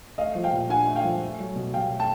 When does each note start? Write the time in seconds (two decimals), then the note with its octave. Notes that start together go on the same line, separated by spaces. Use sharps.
0.18 A3 D#5 F5
0.35 F3
0.44 F5 G5
0.53 A#2
0.69 D4 F#5 G#5
0.87 A3
0.96 F5 G5
1.04 F3
1.21 A3
1.39 F#3
1.56 B2
1.74 B2 F5 G5
1.91 A3
2.00 G5 A5